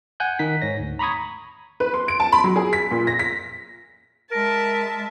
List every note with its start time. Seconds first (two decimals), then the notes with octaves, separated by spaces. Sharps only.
0.20 F#5 G#5 F#6 G6
0.39 D#3 D#4 B6
0.62 G#2 C#5 A#6
0.80 D2
0.99 A#5 B5 C#6 D#6 G#6
1.80 B4
1.94 C6
2.08 D7
2.20 A5
2.32 B5
2.44 F#3
2.56 G#4
2.73 B6
2.91 A#2
3.07 A#6
3.19 B6
4.31 G#3 A#4 E5 A5